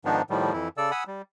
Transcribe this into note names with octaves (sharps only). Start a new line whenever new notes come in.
G#2 D#3 F3 B3 D4 D#4
A2 D#3 F3 G3
F2 E3 E4
C#3 A4 D5 E6
F#5 G#5 B5 D#6 E6
G3